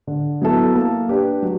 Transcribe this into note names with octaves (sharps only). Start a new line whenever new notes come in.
D3
F#3 B3 E4 A4
A#3
D4 G4 B4
F#3